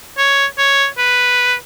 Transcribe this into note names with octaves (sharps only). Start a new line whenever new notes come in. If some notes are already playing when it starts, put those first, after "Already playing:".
C#5
C#5
B4